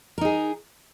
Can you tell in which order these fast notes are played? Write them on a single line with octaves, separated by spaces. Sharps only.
A#4 D#4 G#4